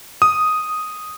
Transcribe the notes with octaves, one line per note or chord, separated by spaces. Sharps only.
D#6